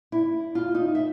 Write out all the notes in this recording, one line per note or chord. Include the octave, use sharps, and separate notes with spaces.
E4
F4
D#4
E5